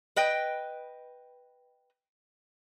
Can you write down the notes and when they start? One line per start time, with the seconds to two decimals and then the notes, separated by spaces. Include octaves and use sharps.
0.16 B4 D#5 G5